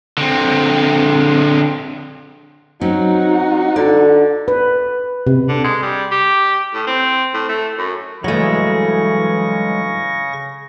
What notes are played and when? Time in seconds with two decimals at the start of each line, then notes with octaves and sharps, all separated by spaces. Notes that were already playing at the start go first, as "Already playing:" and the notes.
0.18 D3 C4
2.81 F#3 C4 C#4 D#4 F#4
3.76 D3 D5
4.48 B4
5.27 C3
5.48 D3
5.64 G#3
5.82 G3
6.11 G4
6.74 A2
6.87 C4
7.34 A2
7.49 A3
7.78 F#2
8.24 G2 C#3 E3 F#3 G#3 A3 C#6 A#6